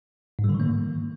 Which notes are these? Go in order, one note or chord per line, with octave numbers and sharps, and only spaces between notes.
G#2
G3
D3
D#3
A#3